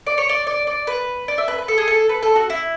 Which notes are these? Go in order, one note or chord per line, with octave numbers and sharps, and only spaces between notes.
D5
C#5
D5
D5
D5
B4
D5
E5
B4
B4
A4
G#4
A4
B4
A4
F#4
E4